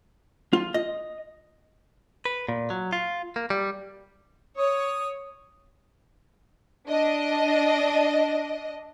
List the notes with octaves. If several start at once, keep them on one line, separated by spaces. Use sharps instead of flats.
F4
D#5
B4
A#2
F#3
F4
A#3
G3
C#5 D#6
D4 D#5